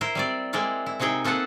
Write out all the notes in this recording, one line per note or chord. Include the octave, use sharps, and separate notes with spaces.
E4 A#4 C5
G3 C4 D5
G#3 A#3 C4 E4 D5 F5
E4
C3 C4 D#4 G#4 G5
A#3 C4 A4 B4 F#5 A5